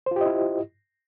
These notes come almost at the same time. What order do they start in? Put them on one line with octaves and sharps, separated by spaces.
C5 F4 G4 D#5 E4